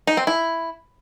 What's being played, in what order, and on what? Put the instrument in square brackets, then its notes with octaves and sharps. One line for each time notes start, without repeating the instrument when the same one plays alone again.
[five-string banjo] D#4
C4
E4